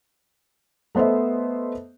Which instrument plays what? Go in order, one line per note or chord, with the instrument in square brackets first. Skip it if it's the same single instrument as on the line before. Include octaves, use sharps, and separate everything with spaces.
[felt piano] A3 B3 C5 D#5 E5